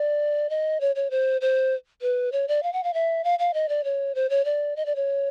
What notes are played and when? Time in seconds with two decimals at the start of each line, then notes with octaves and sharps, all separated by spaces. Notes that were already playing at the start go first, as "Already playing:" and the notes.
Already playing: D5
0.50 D#5
0.81 C#5
0.96 C#5
1.10 C5
1.41 C5
2.02 B4
2.32 C#5
2.48 D5
2.63 F5
2.73 F#5
2.84 F5
2.94 E5
3.24 F5
3.39 F5
3.54 D#5
3.69 D5
3.84 C#5
4.15 C5
4.30 C#5
4.45 D5
4.76 D#5
4.86 D5
4.96 C#5